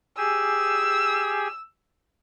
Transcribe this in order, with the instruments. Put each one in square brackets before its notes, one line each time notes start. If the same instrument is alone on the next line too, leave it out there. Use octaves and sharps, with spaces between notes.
[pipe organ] G4 G#4 G#5 [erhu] E6